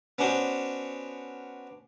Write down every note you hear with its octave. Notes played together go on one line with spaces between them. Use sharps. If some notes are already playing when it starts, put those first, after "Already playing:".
B3 C#4 D4 F#4 C5